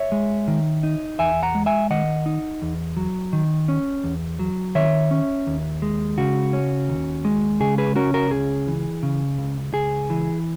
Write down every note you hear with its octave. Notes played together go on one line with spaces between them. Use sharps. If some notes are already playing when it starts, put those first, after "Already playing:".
Already playing: C#5 E5
G#3
D#3
D#4
E2 E5 G#5
F#5 A#5
G#3
E5 G#5
D#3 D#5 F#5
D#4
E2
F#3
D#3
C#4
E2
F#3
D#3 C#5 E5
C#4
D#2
G#3
C#3 F#4
C#4
D#2
G#3
C#3 G#4
G#4 B4
C#4 F#4 A#4
F#4 A#4
C#2 G#4
E3
C#3
C#2
C#2 G#4
E3